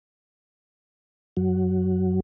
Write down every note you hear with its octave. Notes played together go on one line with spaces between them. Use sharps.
F#2 F#3